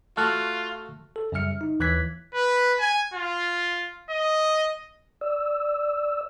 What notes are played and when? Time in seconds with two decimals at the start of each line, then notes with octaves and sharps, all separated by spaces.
0.17 A3 F4 F#4 A5 F6 F#6
1.16 A4
1.32 F#2 C#3 G3 E5 F6 C#7
1.61 D#4
1.80 D#2 E3 F#6 G#6 B6
2.34 B4
2.79 G#5
3.14 F4
4.10 D#5
5.21 D5 E6